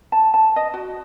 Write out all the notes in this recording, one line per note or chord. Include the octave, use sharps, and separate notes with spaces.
A5
A5
D#5
F#4